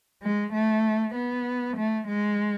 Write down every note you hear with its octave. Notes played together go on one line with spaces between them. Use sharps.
G#3
A3
B3
A3
G#3